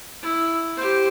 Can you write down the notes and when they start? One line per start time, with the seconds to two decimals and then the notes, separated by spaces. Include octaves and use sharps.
0.23 E4
0.77 G4 C5